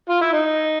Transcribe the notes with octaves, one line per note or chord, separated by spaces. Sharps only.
F4
E4
D#4